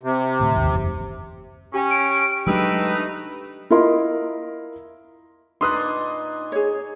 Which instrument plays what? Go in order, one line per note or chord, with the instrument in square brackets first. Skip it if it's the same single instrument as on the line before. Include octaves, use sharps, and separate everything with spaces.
[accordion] C3
[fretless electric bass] D2 A2
G#1 D#2
F#1 E2
[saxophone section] C#4 [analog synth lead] G4
[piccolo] D7
[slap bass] F#3 G#3 D4 [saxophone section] A3 D#4 B4 [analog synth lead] G4 [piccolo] E6
[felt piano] E4 F4 A#4 D#5 C6
[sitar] A#2 D#4 [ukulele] D4 B4 [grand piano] C6 D#6 F#6
[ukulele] G#4 C#5